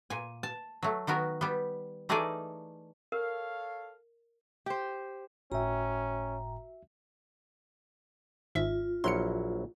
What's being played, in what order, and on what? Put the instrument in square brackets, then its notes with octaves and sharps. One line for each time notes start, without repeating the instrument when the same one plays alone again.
[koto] A#2 G#5
A5
F#3 A3
D#3 B3 F#4 A#4
G3 B3
E3 A3 D#4 G#4 A#4 D5
[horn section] A4 C#5 F5 [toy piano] A#4
[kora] G4 C5
[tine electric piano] G1 A2 G5 [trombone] C#4 [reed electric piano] F#4 E5 [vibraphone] A#5
[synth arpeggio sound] G#1 G#2 E5 [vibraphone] F4
[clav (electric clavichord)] A#1 F#3 E4 [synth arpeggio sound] C6 F6 C#7